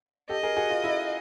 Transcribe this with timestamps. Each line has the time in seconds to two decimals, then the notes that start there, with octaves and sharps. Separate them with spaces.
0.29 G4 A4 D#5
0.43 G#4 A#4
0.57 F#4 G#4
0.70 F4
0.84 E4